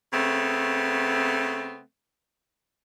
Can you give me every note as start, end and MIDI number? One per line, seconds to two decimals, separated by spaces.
0.13 1.81 49
0.13 1.81 57
0.13 1.81 59
0.13 1.81 60